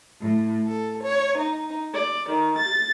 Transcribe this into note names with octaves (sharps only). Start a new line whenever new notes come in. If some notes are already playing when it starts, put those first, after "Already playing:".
A2
A4
C#5
D#4
D5
D#3
A6